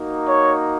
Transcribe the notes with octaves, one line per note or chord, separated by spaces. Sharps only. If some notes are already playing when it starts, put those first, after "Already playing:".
Already playing: A#3 D#4 F#4
C#5